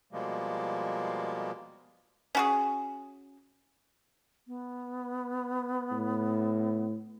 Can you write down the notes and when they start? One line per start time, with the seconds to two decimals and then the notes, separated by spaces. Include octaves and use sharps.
0.12 B2 F3 G3 G#3 A#3
2.35 C#4 F#4 G#4
4.48 B3
5.91 A2